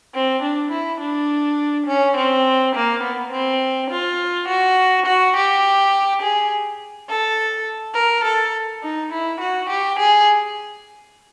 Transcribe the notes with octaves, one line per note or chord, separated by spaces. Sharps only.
C4
D4
E4
D4
C#4
C4
A#3
B3
C4
F4
F#4
F#4
G4
G#4
A4
A#4
A4
D#4
E4
F#4
G4
G#4